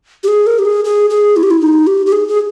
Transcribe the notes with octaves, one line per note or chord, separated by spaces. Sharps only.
G4
G#4
A#4
G4
G#4
G#4
G#4
E4
G4
E4
D#4
G4
G4
G#4
G#4